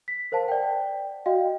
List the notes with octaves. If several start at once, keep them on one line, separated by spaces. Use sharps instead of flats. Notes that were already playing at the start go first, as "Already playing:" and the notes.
B6
A#4 C5 F5 A5
D5 F#5 G5
F#4 D5 D#5 F5 G5